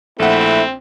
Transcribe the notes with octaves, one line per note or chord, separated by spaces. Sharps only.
A#1 A3 C4 E4 F#5